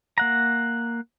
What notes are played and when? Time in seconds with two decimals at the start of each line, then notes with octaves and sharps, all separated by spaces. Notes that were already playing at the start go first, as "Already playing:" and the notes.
0.18 A#3 F#5 A#5